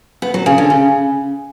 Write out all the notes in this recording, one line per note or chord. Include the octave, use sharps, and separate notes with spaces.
B3
F#3
C#3
D3
C#3